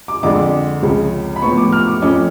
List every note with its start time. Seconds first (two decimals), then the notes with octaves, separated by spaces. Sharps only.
0.08 D6
0.23 F2 D3 G#3 D4 D6
0.83 C#2 C#3 F3
1.36 B5
1.42 A2 F3 B3 C#6
1.57 D6
1.72 F6
1.88 D6
2.02 F2 F3 A3 C#4 D6